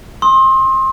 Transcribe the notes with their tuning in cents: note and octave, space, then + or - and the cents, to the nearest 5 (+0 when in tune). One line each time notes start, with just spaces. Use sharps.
C6 +25 D#6 +35